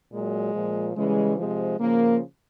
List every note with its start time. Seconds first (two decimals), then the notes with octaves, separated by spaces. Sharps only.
0.12 A#2 F#3 G#3
0.55 A#2 F3
0.96 C#3 E3 G3 G#3
1.37 C3 F3 G#3
1.79 C#3 F3 A#3